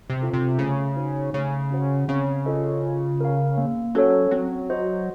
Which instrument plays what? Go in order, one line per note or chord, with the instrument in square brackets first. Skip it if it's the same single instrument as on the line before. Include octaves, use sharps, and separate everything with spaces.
[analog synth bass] C3
[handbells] C4 F4 A4
[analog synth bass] C3
[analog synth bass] C#3 [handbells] A3
[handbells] D#4 F#4 C5
[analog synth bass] C#3 [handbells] A3
[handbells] C#4 F#4 C5 F#5
[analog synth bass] C#3 [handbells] C4
[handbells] F4 A4 C5 D#5
F4
A#4 F5
A#3
[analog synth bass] F#3 [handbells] C#4 A4 C#5
[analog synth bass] F#3 [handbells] C4
[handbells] F#4 C5 D#5